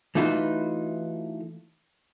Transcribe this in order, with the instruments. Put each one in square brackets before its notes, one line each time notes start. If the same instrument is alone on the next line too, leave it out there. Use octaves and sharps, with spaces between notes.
[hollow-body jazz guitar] E3 A3 D#4 F4 F#4 B4